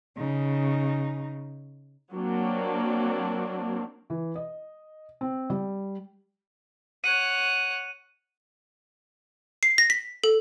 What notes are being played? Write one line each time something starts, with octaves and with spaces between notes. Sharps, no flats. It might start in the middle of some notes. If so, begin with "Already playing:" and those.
C#3 D#4
F#3 A#3 C4 D4
E3
D#5
C4
G3
C#5 F#5 D#7
C7
A#6
B6
A4